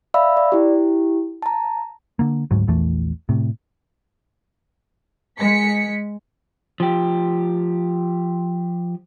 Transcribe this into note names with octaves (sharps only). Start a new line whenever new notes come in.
D5 E5 F5 B5 E6
D5
E4 G4
A5 A#5
D3 A#3
D2 G#2 F#3
A#1 E2 E3 A3
A2 C3
G#3 B6 C#7
F3 G4